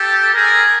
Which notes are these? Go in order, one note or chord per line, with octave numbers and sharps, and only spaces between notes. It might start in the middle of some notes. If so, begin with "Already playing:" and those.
Already playing: G4 A4
G#4 A#4